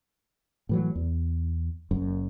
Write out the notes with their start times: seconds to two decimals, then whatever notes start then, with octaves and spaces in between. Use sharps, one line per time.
0.69 A2 E3 F#3
0.95 E2
1.91 F#1 F#2